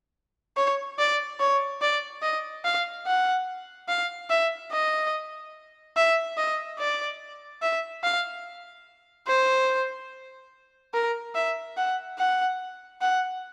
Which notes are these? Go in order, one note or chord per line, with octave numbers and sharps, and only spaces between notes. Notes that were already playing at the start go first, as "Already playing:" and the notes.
C#5
D5
C#5
D5
D#5
F5
F#5
F5
E5
D#5
E5
D#5
D5
E5
F5
C5
A#4
E5
F#5
F#5
F#5